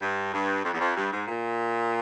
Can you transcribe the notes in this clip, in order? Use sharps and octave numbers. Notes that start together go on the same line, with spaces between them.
G2
G2
F2
E2
F2
G2
G#2
A#2